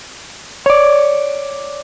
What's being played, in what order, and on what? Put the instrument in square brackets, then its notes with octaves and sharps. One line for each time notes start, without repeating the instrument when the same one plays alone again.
[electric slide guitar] C#5 D5